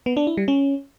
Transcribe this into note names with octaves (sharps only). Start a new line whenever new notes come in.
B3
D4
E4
G3
C#4